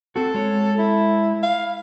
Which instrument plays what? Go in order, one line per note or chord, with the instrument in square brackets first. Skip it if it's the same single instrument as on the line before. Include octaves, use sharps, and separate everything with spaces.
[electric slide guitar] C4 F#4 [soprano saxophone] A4
[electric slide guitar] G#3 C#5
[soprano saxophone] E4
F5